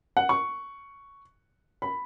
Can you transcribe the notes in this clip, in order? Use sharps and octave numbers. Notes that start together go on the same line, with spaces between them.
F#5
C#6
B5